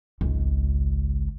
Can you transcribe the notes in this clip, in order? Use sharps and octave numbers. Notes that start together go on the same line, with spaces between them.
G#1 C#2